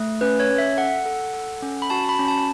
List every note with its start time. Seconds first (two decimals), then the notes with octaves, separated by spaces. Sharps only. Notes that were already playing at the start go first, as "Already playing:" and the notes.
Already playing: A3
0.21 C#4 B4
0.40 C#5
0.49 C#4
0.58 E5
0.77 A4 F#5
1.06 A4
1.34 A4
1.62 C#4
1.82 B5
1.90 F#4 A5
2.04 A5
2.09 B5
2.19 C#4
2.28 A5